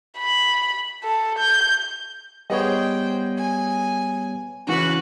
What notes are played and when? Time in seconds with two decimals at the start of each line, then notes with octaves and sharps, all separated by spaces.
0.18 B5
1.04 A4
1.39 G6
2.50 G3 B3 G#4 C5 C#5 D#5 G5
3.37 G#5
4.67 C#3 E3 C#4 F#4 B4